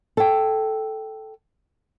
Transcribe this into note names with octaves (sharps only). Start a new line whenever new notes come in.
A4 G5